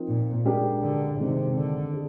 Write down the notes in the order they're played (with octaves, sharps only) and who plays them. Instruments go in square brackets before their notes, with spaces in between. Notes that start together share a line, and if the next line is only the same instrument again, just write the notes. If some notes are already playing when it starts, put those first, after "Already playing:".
Already playing: [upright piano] F3 C4 D#4 A#4
[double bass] A#2
[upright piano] G#3 D4 G4 A#4
[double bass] D3
[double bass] C3 [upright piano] D#3 G#3 C4
[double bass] D3
[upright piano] G#4